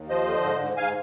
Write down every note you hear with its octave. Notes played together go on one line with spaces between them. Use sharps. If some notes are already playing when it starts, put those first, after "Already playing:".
Already playing: D#2
F3 C5 D#5
D3
G#2
G#2
G#2 F5 G#5